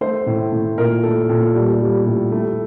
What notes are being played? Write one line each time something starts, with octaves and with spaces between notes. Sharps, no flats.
A3 C5
A2
A2
A#2 A#4
A3 A4
A#2 A4
G3
G3
A2
A3